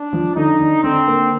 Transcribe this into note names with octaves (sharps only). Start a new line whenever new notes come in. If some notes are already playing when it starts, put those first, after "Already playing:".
Already playing: D4
F3
D3 D#4
D3
D3 C4
A#3